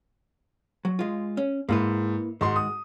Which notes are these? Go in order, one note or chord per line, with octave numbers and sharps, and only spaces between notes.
F#3
G#3 F4
C#4
G#2 A#3 E4 B4
G#2 D#3 G#3 F#4 C6
D#6